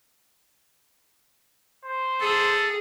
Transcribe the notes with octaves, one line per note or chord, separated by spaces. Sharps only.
C5
G#4 A4